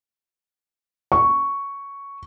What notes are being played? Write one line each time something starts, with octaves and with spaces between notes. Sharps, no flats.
C#6